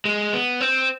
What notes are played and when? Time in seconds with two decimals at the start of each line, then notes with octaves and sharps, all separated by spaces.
0.05 G#3
0.33 B3
0.61 C4